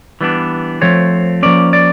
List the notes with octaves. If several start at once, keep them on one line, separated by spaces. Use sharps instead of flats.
E3 G3 B3 D4
F3 A3 C4 C#5
F3 A#3 C#4 D5
D5